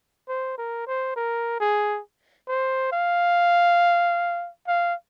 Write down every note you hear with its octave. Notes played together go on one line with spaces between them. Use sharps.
C5
A#4
C5
A#4
G#4
C5
F5
F5